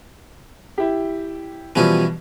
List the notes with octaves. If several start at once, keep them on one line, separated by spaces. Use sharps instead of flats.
E4 G4
B2 E3 F3 G3 C#4